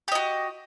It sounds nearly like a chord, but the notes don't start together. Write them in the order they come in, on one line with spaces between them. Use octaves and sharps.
G4 D#5 F#4